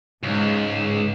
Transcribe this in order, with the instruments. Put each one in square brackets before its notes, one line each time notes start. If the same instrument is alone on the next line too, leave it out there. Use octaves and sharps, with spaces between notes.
[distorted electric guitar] C#2 [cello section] G#2